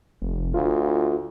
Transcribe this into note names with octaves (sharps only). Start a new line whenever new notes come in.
F1
D2 F4